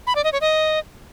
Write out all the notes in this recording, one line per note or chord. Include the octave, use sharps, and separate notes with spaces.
B5
D5
D#5
C#5
D#5